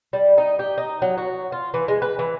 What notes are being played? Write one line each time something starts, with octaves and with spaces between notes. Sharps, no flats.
G3
D#4
G4
D#4
F#3
F#4
F4
E3
G#3
B4
E3